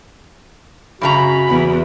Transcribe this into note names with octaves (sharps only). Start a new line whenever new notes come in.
F#2 C#3 F#4 A#5 B5
E2